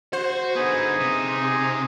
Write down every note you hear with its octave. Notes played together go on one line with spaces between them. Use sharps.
F#4 C5
D3 B3 D#4 G#4 G#5
C3